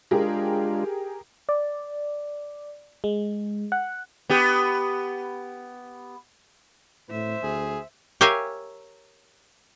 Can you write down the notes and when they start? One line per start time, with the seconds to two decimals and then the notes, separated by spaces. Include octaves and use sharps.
0.11 G#3 D4 F4 G4 G#4 A#4
1.49 D5
3.04 G#3
3.72 F#5
4.30 B3 G4
7.10 A2 C5 E5
7.43 D2 G#4
8.21 G4 A#4 C#5 E5 F5 G#5